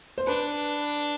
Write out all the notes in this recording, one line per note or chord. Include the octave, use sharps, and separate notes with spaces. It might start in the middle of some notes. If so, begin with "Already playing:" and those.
C5
D4 B4